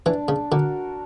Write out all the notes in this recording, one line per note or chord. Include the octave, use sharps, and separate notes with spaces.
E3 D4
C#3
D3 F#4 A#4